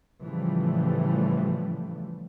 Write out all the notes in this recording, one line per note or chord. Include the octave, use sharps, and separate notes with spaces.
A2 C#3 E3 F3 G3 A3